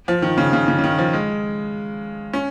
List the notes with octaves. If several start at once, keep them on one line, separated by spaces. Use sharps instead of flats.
F3
D#3
C#3
C#3
C#3
C#3
D#3
F3
G#3
C#4